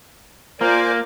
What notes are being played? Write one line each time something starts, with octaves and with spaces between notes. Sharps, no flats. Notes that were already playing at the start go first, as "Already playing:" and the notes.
A#3 F4 A#4 C5 D5 G#5 D6